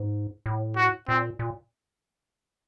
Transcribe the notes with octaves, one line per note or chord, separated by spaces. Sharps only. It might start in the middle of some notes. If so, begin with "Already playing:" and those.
Already playing: G#2
A2
F#4
A#2 C4
A#2